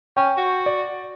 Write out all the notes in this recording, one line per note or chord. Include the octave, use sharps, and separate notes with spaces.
C#4 G5
F#4
D5